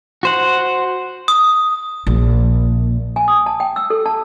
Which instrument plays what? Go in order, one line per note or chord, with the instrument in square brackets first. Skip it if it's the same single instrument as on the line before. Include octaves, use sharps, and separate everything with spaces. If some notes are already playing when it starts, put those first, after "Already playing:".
[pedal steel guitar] F#4 C5 F#5
[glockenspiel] D#6
[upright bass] A#1
[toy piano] G#5
D#6
A5
G5
E6
A4
A5